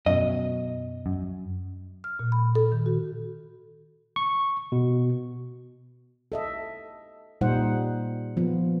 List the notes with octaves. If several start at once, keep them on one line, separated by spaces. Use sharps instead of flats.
F#2 B2 D#5
F#2
F6
A#2
B5
A4
D#3
F#4
C#6
B2
A4 D#5 E5
A#2 G3 D#4 C5 F#5
F3 B3